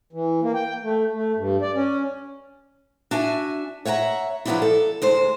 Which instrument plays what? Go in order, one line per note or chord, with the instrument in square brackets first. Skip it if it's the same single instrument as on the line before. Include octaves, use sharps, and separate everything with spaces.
[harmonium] E3
A#3
G5
A3
A3
G2
D5
C#4
[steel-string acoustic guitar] D4 F#4 E5 G#5
C#5 E5 F#5 G5 A#5
F3 F#3 B3 C4 D4 E4
A4
D2 G#3 C5